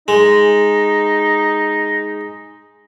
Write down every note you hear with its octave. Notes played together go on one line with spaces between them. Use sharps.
G#3 D#4